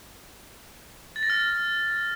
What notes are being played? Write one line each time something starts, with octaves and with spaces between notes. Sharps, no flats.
A6
A#6
F6